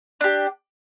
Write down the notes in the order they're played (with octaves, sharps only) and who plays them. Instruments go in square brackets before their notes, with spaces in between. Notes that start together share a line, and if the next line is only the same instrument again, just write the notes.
[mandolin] D4 G4